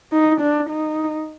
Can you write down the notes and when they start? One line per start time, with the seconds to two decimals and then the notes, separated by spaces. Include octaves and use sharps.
0.12 D#4
0.41 D4
0.70 D#4